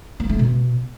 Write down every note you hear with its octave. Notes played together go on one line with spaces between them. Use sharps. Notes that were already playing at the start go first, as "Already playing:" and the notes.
A#3
A3
B2